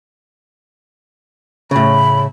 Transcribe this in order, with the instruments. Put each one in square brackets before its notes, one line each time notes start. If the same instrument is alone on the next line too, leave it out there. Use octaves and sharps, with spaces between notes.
[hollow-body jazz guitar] A2 C#3 [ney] B5